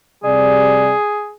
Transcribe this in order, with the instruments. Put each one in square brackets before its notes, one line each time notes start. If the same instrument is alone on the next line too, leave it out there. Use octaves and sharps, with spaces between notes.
[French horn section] C3 G3 D5 [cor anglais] G#4